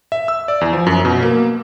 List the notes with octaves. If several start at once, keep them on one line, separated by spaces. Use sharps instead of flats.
E5
E6
D5
E2
F3
F#2
B2
A#3